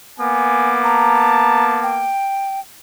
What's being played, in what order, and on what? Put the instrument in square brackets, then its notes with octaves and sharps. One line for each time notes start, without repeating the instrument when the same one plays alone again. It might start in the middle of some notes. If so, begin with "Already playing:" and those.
[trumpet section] A#3 B3 D6 [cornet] G#5
[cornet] A5 [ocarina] A#5
[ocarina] G5